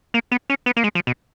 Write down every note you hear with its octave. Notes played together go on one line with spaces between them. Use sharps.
A#3
B3
C#4
B3
A#3
G#3
F3
B2